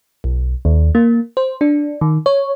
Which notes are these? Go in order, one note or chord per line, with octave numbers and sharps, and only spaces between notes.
B1
D#2
A#3
C5
D4
D#3
C#5